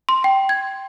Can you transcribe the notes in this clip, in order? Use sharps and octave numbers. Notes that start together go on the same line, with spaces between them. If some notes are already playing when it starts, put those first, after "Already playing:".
C6
G5
G#6